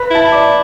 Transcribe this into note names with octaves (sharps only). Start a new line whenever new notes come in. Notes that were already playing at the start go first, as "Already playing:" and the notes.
Already playing: B4 B5
E4 A5
B5
D5 D6